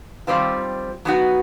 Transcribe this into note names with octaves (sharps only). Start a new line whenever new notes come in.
D#3 G3 C4 F4
F#3 B3 D#4 F#4